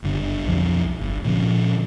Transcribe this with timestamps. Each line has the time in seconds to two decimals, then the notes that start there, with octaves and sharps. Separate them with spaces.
0.02 F#1 G2 D3
0.45 B1 F2 F3
1.00 G1
1.25 A#2 D3 F3 C#4